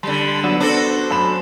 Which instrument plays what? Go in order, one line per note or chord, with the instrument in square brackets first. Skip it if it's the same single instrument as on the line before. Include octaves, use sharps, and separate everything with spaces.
[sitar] D3 G3 [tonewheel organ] A5 B5
[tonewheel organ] F#3 D4 E6 [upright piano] B3
[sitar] D4 F#4 A4 [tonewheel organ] C5
[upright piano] F#2 B5 E7